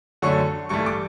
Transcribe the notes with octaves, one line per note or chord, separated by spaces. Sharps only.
F#2 D3 F#3 A3 C#6
G2 E3 A3 C#6
D6